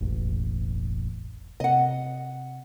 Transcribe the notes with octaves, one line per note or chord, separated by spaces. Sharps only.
E1 A1
C3 D#5 F#5